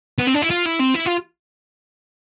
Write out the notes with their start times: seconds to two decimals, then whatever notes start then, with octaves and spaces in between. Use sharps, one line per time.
0.18 B3
0.27 C4
0.34 D4
0.42 E4
0.50 F4
0.65 E4
0.79 C4
0.94 E4
1.05 F4